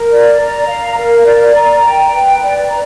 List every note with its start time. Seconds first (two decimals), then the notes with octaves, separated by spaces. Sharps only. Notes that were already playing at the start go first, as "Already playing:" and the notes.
Already playing: A#4
0.10 D5
0.39 A#5
0.68 F5
0.97 A#4
1.25 D5
1.55 A#5
1.83 G5
2.11 B4
2.41 D5
2.69 A#5